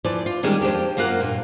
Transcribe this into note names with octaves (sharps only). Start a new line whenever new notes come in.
E3 F3 D5
F4
D#3 G3 G#3 A#3 C#4
F2 F3 D4 G4
F#2 A#3 F4 F5 F#5
G2 A#2